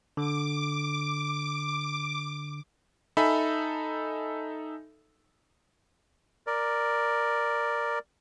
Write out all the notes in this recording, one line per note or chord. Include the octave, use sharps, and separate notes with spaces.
D3 D6
D#4 A4 E5 G#5 B5
A#4 D5